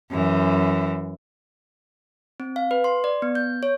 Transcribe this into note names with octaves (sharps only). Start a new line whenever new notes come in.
F#2 E3
C4
F5
B4
C6
D5
B3
G6
C#5